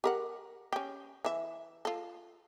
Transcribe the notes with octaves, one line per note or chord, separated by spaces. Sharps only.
G4 A#4 F#5
C#4 G4
E3 E5
F4 A4